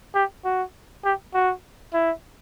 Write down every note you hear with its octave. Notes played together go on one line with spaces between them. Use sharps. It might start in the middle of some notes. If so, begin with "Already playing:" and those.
G4
F#4
G4
F#4
E4